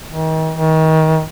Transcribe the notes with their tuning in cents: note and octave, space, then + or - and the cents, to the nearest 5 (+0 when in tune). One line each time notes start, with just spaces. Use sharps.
D#3 +40
D#3 +30